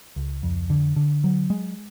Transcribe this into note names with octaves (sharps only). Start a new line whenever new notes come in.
C#2
F2
D3
D3
F#3
G#3